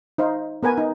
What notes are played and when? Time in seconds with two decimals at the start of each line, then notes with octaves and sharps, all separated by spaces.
0.18 D#4 C5 F5
0.63 B3 A#4 B4 G#5
0.78 D#4